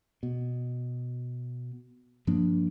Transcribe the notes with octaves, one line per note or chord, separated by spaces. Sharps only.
B2
G2 F3 A#3 D4